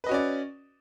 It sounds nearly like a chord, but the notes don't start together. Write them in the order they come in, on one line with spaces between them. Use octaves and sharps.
B4 D#5 F#4 C#4 D5